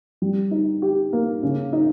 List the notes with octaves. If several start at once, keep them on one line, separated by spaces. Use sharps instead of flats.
G3
D#4
G4
A#3
C#3
D#4